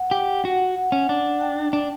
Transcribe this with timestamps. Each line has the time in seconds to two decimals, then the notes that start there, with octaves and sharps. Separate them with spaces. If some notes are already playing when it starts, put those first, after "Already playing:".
Already playing: F#5
0.11 G4
0.45 F#4
0.76 F#5
0.92 C#4
1.09 D4
1.41 G5
1.73 D4